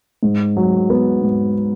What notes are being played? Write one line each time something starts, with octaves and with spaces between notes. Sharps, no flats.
G#2
F#3
B3
G#2